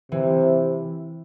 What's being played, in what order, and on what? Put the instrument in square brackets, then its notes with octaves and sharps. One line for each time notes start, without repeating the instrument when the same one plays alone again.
[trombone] C3 [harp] E3